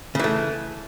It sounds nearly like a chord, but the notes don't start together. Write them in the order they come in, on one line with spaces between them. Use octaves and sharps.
C#3 E3 A3